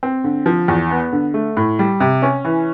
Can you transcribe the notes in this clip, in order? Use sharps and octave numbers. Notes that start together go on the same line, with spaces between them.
C4
D3
F3
E2
B3
D3
A3
A2
G3
C3
C#4
E3